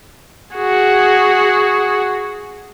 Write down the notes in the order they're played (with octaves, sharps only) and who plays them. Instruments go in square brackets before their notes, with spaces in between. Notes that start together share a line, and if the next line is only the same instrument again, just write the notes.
[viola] F#4 G#4